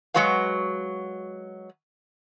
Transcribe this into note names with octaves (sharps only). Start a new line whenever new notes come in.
F#3 G#3 F#4 B4 F5